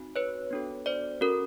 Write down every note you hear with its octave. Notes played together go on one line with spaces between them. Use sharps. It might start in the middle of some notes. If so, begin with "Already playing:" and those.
Already playing: C4 D#4 F#4
B4 C#5
B3 D4 F#4 A4
C5 D5
C#4 F#4 A4 A#4